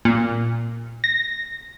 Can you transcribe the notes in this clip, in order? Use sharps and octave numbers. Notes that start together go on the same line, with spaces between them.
A#2
A#6